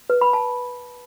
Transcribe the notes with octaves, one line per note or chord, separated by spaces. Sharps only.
B4
B5
A5